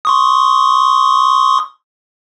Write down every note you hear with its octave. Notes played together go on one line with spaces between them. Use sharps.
C6 C#6 D#6